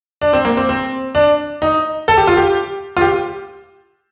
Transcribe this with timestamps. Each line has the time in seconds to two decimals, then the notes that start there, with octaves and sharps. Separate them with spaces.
0.21 D4
0.33 C4
0.45 A#3
0.57 C4
0.69 C4
1.15 D4
1.62 D#4
2.08 A4
2.17 G4
2.27 F4
2.37 G4
2.97 F4
3.01 G4